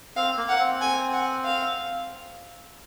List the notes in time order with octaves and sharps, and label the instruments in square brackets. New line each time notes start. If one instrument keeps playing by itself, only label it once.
[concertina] C4 [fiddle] F5
[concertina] A#3
[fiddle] F#5
[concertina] C4
[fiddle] G#5
F#5
F5